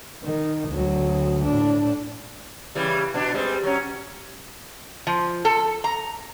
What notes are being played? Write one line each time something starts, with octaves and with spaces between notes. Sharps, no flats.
D#3
D2 F#3
A2 D4
C#3 E3 G3
B2 D4
G3 G#3 C4
F#3 C#4
F3
A4
A#5